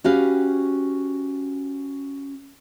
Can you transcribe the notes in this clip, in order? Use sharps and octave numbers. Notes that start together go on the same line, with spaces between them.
C#4 F#4 G4 B4 F5